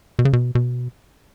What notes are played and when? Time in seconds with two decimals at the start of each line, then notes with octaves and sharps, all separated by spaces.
0.19 B2
0.25 C#3
0.33 B2
0.55 B2